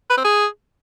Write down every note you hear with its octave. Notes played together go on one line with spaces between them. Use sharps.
B4
C4
G#4